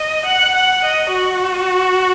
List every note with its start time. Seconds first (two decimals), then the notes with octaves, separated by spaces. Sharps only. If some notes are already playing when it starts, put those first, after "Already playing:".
Already playing: D#5
0.25 F#5
0.55 F#5
0.84 D#5
1.13 F#4